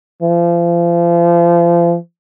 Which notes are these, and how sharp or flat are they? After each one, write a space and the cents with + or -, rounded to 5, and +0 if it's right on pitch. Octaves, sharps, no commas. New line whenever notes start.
F3 -35